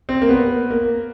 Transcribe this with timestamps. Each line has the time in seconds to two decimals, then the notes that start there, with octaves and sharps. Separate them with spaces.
0.09 C4
0.22 A#3
0.29 B3
0.71 A#3